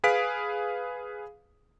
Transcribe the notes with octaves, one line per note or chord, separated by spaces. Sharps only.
G#4 B4 F5 B6 D7